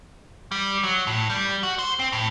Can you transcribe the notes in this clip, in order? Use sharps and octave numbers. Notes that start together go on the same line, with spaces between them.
G3
F#3
A2
G3
F#4
C5
C4
A2